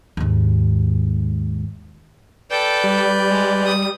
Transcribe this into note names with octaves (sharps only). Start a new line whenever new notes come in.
D#2 G#2
A4 B4 D5 G5 G6
G3
G#3
D#6